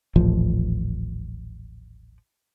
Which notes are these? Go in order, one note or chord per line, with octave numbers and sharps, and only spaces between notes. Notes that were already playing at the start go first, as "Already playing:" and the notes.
D#1 A1 F3